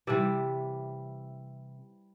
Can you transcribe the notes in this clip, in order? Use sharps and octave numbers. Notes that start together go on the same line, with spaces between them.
C3 E3 G3 D5 E5